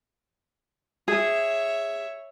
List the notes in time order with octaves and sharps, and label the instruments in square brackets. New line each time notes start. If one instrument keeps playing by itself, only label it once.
[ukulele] G#4 [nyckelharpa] C#5 E5